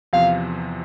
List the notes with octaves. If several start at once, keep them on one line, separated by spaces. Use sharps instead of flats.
E2 C3 F3 F5